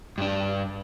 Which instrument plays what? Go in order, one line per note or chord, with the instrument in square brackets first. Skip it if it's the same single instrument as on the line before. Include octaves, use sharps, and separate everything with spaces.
[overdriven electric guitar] G2 D4